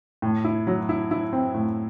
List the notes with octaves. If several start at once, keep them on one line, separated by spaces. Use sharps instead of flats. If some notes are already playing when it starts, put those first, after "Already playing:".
A2
E4
F#3
E4
E4
C4
A2